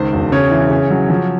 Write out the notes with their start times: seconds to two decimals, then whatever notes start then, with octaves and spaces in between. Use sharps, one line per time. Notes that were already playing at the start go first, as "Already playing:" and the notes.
Already playing: C#2 D#3 C5
0.13 E1
0.32 C#3 C#5
0.51 E3
0.70 C#3
0.91 F#3
1.10 F3